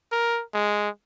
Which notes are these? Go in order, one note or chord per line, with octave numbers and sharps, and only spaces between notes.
A#4
G#3